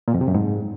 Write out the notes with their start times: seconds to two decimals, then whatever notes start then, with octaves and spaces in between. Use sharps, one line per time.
0.08 A#2
0.14 F2
0.21 C3
0.28 F#2
0.34 G#2